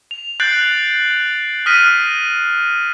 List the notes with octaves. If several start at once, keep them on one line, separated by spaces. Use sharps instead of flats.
F7
F#6 G6 A6 C7 D7 F#7
D#6 F6 A#6 B6 D#7